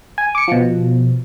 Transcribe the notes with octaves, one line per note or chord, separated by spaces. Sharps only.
G#5
D6 C#7
B2 F3